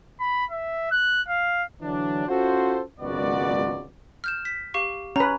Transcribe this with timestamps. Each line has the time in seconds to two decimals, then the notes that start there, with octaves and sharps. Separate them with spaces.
0.20 B5
0.50 E5
0.91 F#6
1.28 F5
1.82 D3 E3 F#3 D4
2.28 C#4 F4 F#4 A4 C5
3.00 G#1 C#2 F#2 B3 F#4 D5
4.24 F6 G6 E7
4.45 B6
4.74 G4 F5 C#6
5.16 C#4 B4 A#5